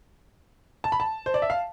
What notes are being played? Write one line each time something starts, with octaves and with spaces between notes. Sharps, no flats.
A5
B5
A5
C5
D5
E5
F5